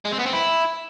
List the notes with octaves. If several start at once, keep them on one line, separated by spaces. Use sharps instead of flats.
G#3
C4
B3
C4
E4